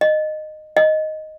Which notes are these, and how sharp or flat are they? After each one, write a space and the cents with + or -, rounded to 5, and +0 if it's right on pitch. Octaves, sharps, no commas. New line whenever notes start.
D#5 -15
D#5 +0